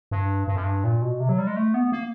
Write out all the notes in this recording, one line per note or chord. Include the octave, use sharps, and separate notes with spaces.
G2
G2
F#2
G2
A#2
B2
C3
F#3
G3
G#3
A3
B3
A#3